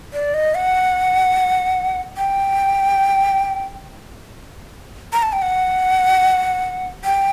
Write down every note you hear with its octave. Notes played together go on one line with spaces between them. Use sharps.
D5
D#5
F#5
G5
A#5
A5
G5
F#5
G5